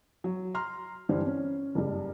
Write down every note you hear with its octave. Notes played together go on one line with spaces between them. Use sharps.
F#3
A#5 C6 F6
G2 D3 E3 C5
C#4
F#1 G2